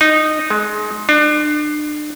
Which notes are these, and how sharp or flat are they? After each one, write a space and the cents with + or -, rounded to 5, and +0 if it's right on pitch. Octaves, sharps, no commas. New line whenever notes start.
D#4 -10
G#3 +25
D4 +35